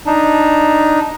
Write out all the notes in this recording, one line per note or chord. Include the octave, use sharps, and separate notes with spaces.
D4 D#4